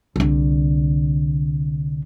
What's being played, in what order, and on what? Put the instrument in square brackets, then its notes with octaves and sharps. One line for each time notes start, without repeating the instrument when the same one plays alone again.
[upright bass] C2 D3